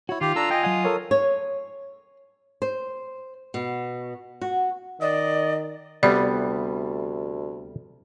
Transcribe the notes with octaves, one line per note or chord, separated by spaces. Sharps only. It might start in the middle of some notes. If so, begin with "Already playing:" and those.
E4 F#4 C#5
D#3 F4 G4
D4 A4 A#5 E6
D#5 G5 G#5
F#3 D#5 F#5 G#5 D#6
A4 A#4 C#5
C#5
C5
B2
F#4
D#3 D5 D#5
D2 C3 G3 B3 D5